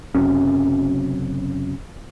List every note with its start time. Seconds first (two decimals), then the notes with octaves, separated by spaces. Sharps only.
0.15 F#1 F#2 C3 C#4